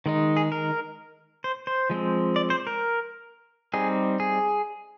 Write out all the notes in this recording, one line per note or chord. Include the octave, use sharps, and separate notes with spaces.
D#3 G#3 D#4
G#4
A#4
C5
C5
F3 G#3 C4
D5
C5
A#4
G3 C4 D#4 G#4
G#4